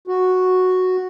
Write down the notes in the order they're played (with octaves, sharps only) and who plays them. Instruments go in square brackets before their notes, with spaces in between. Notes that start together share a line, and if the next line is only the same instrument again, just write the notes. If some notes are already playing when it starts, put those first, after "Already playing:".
[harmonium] F#4